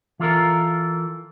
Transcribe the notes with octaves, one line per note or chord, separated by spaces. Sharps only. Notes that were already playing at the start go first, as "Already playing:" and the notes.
E3 F4 A4 A#4